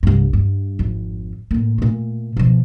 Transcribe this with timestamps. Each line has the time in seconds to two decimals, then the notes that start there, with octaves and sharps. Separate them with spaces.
0.03 C2 G2
0.33 G2
0.79 G#1 F2
1.51 A2 A#3
1.78 A#2 A3
2.37 B2 F3